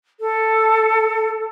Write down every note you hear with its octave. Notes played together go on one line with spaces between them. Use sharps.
A4